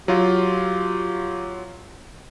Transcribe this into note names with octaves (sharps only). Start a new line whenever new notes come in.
F#3 F4 G4